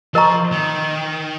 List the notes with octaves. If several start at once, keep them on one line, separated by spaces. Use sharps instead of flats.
F3 A#4 D#5 A#5 C#6
D#3